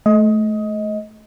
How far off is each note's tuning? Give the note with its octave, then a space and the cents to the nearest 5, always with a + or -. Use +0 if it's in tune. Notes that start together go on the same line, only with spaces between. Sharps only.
A3 -25 D#5 +20